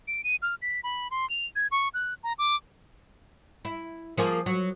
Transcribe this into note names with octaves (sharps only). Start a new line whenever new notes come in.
D7
D#7
F6
B6
B5
C6
F7
G#6
C#6
F#6
A#5
D6
E4
F3 A#3 G#4
F#3